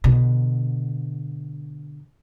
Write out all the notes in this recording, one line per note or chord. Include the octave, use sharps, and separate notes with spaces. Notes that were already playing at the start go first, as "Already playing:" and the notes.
B2 D3